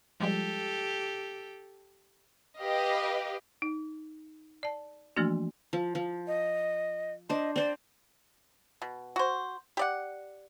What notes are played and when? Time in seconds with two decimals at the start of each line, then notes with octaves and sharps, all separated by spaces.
0.20 F3 G3 G#3 G4 A4
2.59 G4 B4 D#5 F5
3.62 D#4
4.63 D5 A5
5.17 E3 F3 A3 A#3 D4 F#4
5.73 F3
5.95 F3
6.27 D#5
7.29 D4 C5 D#5
7.56 C4 C5 D5
8.82 B2
9.16 F#4 C5
9.77 G4 D5 F#5